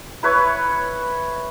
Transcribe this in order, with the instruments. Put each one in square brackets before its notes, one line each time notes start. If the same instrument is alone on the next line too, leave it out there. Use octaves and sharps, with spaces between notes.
[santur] E4 B4 C#5